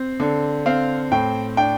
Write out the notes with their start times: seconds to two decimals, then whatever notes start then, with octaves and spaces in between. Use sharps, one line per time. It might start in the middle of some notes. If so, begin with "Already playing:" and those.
Already playing: C4
0.20 D3
0.66 C4 F5
1.12 A2 G5
1.57 D4 G5